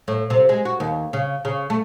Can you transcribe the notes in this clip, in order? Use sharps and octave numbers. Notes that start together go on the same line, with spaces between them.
A2
C3
G#3
F#4
D#2
C#3
C#3
A3